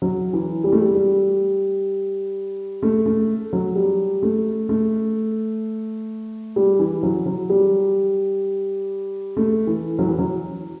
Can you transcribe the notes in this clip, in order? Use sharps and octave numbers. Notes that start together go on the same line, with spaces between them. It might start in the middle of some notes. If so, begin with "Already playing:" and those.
F#3
E3
G3
A3
G3
G3
A3
A3
F#3
G3
A3
A3
G3
E3
F#3
F#3
G3
A3
E3
F#3
E3
F#3